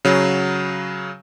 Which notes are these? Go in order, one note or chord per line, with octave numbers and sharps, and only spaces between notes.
C#3 F#3